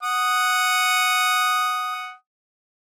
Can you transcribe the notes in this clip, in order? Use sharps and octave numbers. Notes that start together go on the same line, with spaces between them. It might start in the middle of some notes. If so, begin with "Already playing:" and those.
F#5 D#6